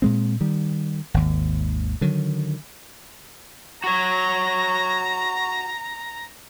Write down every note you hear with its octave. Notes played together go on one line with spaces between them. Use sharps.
A#2 G#3 C4
D#3 G3
G#1 D#2
D3 D#3 F#3
F#4 C#5 A#5